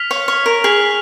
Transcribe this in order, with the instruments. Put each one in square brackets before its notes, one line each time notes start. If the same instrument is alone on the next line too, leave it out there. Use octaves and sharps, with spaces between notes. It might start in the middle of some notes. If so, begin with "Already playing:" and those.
Already playing: [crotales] F6 B6 F7
[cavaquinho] C#5 F5
C#5
A#4
[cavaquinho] G#4 [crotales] F6 B6 F7